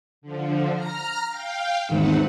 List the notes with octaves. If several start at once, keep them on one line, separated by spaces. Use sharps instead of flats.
D3 F3
A#5 F6 A#6
F5 G5
E2 G#2 D#3 C4 B4 F#5